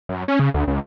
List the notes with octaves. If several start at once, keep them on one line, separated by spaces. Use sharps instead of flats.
F#2
C#4
C#3
D2
C#2